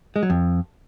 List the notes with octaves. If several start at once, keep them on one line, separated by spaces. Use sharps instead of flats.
G#3
F#3
F2